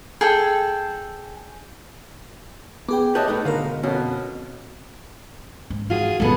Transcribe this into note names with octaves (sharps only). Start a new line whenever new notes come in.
G#4 A4 G5
B3 G#4 G5 D6
G4 B4 C#5 D#5 E5 A5 F#6 G6
A2 A3 D#4 B4
G#2 B2 D3 G#3 A#4 F5
F2 B2 C#4
G#2
F4 F#4 G#4
D#1 G#2 B3 G#4 A4